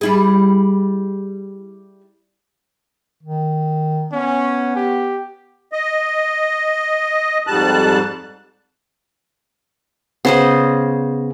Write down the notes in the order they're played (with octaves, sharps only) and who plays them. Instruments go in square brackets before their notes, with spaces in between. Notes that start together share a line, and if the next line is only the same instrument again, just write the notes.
[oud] G3 E4 G#4
[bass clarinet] D#3
[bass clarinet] B3 [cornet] C#4
[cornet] G4
[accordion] D#5
F2 G#2 G3 A5 F#6
[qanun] C#3 C5 D#5 [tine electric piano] B3